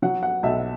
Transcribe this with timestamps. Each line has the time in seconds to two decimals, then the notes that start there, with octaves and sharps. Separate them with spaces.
0.02 F#3 F#5
0.23 F#5
0.43 B1 E5